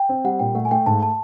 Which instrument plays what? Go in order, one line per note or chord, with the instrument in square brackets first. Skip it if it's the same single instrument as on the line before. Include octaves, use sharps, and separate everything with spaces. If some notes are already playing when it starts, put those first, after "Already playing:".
Already playing: [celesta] G5
[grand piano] C4
[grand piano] G3 [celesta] F#5
[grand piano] A#2 [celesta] G5
[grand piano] A3 [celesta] F#5
[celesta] G#5
[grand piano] A3 [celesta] G5
[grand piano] G#2 [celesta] A5
[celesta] A5